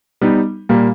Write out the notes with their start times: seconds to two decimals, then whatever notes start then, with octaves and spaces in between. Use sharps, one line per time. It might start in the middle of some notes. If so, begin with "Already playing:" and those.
0.21 G3 B3 D#4
0.69 A#2 G3 A#3